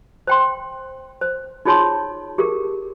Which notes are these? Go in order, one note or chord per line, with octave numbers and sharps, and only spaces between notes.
C5 G5 C6
C5
D#4 F4 G#4 C#5 A5 C6
G4 G#4 A#4